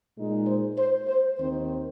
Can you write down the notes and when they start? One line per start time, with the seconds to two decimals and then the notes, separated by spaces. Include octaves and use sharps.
0.17 A#2 G#3 D#4
0.47 C5
0.78 C5
1.08 C5
1.39 D#2 D#3 C4 C5